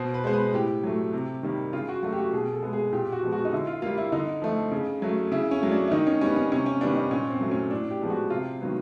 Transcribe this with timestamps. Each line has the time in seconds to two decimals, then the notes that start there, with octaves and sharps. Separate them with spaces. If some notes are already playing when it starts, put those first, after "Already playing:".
Already playing: B2 C5
0.14 B4
0.24 G#3 B3 C5
0.33 B4
0.53 A2 G4
0.83 F#3 A3
1.13 C3
1.43 D#3 G3 A#3
1.73 C#3 F4
1.88 F#4
2.03 F#3 A3 F#4
2.13 G4
2.18 F#4
2.33 B2 G#4
2.53 A4
2.63 G#3 B3
2.73 G#4
2.92 A#2 G4
3.12 F#4
3.23 F3 G#3 B3
3.32 F#4
3.45 D#4
3.53 D3 E4
3.67 F4
3.82 G3 A#3 F4
3.98 E4
4.12 D3 D#4
4.42 F3 A3
4.72 C#3
5.02 F#3 A3
5.32 C#3 E4
5.51 C#4
5.62 F#3 A3
5.71 D4
5.88 E4
5.91 D#3 D#4
6.07 C#4
6.21 G3 B3 C#4
6.36 C#4
6.51 C3 C#4
6.66 C#4
6.81 D#3 G3 B3 D4
6.96 D#4
7.11 A#2 C#4
7.30 C4
7.41 F#3 A3
7.51 C#4
7.71 A2 D4
7.91 G4
8.01 F3 G#3 B3
8.10 F#4
8.30 C3 F4
8.61 D#3 F#3 B3